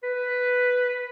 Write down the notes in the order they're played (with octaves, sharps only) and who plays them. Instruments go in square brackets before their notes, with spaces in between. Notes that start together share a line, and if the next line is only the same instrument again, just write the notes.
[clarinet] B4